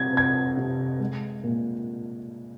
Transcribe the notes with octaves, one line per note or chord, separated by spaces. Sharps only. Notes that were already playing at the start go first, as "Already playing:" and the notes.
Already playing: C3 C4 G#6
C4 G#6
C3
G#3
A#2